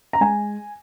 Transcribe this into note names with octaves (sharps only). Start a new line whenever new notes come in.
A#5
G#3 G#5